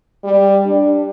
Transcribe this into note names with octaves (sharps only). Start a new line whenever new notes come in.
G3
D4